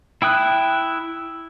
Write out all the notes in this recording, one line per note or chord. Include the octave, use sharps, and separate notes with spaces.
E4 G5 D#6 F#6